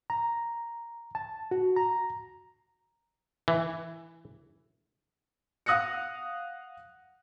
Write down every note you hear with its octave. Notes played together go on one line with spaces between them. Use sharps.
A#5
A5
F#4
A#5
E3
F5 F#5 D#6 F#6 A#6 C#7